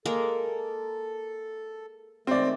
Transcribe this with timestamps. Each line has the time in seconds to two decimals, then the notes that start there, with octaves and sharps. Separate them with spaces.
0.05 G#3 A#3 A4 A#4
2.27 D#3 G#3 A3 C4 D5